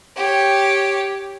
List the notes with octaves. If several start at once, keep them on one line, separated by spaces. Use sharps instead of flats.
G4 C#5